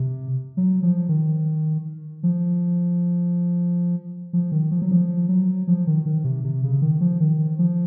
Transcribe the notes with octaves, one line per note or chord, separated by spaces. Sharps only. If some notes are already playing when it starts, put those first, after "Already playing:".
Already playing: C3
F#3
F3
D#3
F3
F3
D#3
F3
F#3
F3
F#3
F3
D#3
D#3
C3
C3
C#3
D#3
F3
D#3
F3